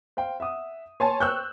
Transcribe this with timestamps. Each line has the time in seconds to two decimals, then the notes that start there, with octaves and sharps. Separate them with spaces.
0.17 C5 F5 G5
0.40 E5 F#5 D#6
1.00 C#5 G#5 A5 C6
1.20 C5 G5 C#6 E6 F#6 G6